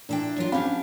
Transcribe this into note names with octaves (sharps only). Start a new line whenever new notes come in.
A#2 D4 E4 G5
F#3 F4
C4 C#4 G4 F5 B5